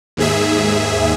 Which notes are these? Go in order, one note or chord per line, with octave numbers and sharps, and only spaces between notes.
D#2 G#2 G#4 E5